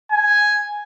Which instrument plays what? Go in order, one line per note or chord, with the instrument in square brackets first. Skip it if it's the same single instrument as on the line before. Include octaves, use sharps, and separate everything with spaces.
[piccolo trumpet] G#5